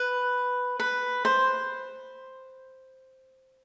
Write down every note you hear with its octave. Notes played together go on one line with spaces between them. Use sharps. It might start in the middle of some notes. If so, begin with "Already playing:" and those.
Already playing: B4
B4
C5